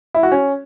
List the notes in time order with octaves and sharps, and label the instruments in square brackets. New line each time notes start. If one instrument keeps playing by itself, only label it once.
[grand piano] E4
F#4
C#4